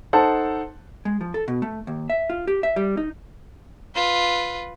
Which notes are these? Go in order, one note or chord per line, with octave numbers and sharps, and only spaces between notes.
D#4 A4 C5 F#5 A5
G#3
F3
A4
B2
A3
D#2
E5
F4
G4
E5
G3
D#4
F4 B4